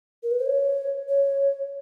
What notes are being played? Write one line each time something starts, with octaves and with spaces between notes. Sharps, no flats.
A#4
B4
C5
C#5
C#5